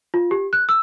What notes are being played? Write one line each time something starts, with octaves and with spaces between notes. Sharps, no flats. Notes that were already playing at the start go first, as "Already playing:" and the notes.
F4
G4
F#6
E6